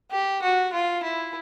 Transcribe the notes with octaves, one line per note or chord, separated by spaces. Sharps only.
G4
F#4
F4
E4